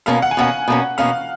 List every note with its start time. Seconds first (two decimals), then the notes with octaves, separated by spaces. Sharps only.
0.06 B2 A#3 C#4 F5
0.22 F#5
0.31 G#5
0.37 B2 A#3 C#4 F#5
0.68 B2 A#3 C#4
0.98 B2 A#3 C#4 F5